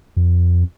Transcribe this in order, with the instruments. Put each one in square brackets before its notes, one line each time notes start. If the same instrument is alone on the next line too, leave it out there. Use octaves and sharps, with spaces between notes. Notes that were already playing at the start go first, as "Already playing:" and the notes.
[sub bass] F2